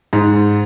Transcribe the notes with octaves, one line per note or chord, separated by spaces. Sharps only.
G#2